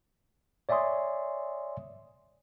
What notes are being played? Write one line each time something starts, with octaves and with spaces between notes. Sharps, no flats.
C#5 D5 E5 G#5 C6 D#6